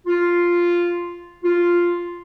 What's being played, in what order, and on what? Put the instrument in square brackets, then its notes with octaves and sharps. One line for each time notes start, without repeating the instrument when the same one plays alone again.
[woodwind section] F4
F4